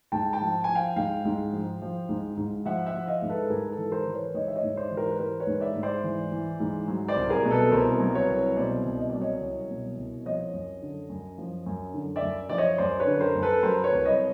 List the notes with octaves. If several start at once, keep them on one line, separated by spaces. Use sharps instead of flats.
G#2 G5 A5
G5 A5
F3
F3 G#5
F5 G5
G#2 F5 G5
G#2
F3
F3
G#2
G#2
F3 E5 F#5
E5 F#5
F3
D#5 F5
G#2
A4 B4
G#2 G#4 A#4
A4 B4
E3
A#4 C5
E3
B4 C#5
G#2 C#5 D#5
E5
C#5 D#5
G#2
C5 D5
E3
A#4 C5
B4
E3 A#4 C5
B4 C#5
G#2
D5 E5
G#2
C5 D5
E3
E3
G#2
F#3
C5 D5
C2
G#4 A#4
B2
A4 B4
C2 A#4 C5
F#3
B4 C#5
C2
B2 C5 D5
C2
D#5
F#3 D5
C#5 D#5
C2
B2
C2
F3 C#5 D#5
F#2
D3
F#2
F3
F#2
D3
D5 E5
F#2
F3 D5
C#5 D#5
F#2 C5 D5
B4 C#5
D3
A#4 C5
F#2
A4 B4
F#3 A#4 C5
B4 C#5
C2
C#5 D#5